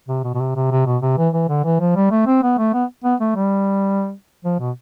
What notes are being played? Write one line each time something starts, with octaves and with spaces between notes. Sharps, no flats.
C3
B2
B2
C3
C3
C3
B2
C3
E3
E3
D3
E3
F3
G3
A3
C4
B3
A3
B3
B3
A3
G3
F3
B2